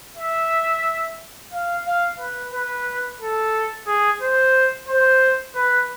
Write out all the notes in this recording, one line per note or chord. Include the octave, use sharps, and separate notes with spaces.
E5
F5
F5
B4
B4
A4
G#4
C5
C5
B4